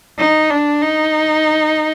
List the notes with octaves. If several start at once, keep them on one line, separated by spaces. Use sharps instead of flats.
D#4
D4
D#4